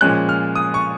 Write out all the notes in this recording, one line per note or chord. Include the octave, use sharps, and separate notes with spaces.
A#2 F3 G#3 C#4 F#6
F6
D#6
C#6